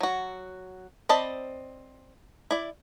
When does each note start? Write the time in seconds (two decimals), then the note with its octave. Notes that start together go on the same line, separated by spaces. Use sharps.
0.01 F#3 F#4
1.09 C4 D5 D#5 A5 B5
2.51 E4 D5